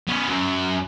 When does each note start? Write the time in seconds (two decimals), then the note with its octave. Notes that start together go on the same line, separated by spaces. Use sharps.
0.08 B3 C#4
0.28 F#2